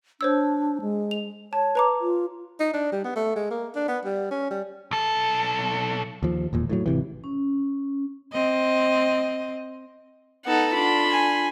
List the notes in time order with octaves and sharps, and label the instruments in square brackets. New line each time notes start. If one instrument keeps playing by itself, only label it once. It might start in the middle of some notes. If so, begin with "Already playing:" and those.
[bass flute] D4 [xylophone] C5 C#5 E6
[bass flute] G#3
[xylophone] F7
[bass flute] C#5 [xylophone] A5
[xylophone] B4 A#5 D6
[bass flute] F4
[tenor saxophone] D#4
D4
G3
B3
A3
G#3
A#3
D4
B3
G3
C#4
G3
[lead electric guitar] B1 A4
[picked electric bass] D#2 F3
E1 D#2 A#2
A2 D#3 F#3
G#1 C3 E3
[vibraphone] C#4
[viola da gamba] C4 D#5
[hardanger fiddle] B3 A4 [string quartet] D#4 F#5
[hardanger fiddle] D4 [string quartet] F4 B5 C6
[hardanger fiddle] G#5